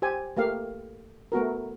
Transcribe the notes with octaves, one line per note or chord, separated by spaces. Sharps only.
G4 C5 G#5
A3 A#3 G4 F5
A3 B3 F#4 A#4